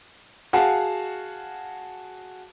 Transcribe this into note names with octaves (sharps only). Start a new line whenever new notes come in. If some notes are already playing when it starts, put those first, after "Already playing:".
F#4 G#4 F5 F#5 A5